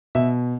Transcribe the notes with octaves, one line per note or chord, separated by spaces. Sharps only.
B2 E5